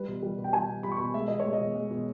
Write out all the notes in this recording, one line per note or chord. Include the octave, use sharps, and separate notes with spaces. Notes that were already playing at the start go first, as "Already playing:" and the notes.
Already playing: G3 B4
B2
G3
B2
G5
G3 G#5
B2
G3 B5
C#6
B2 B5
G#3 E5
B2 D#5
G#3 C#5
D#5
B2
G#3
B2